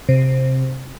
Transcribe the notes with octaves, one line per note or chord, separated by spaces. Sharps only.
C3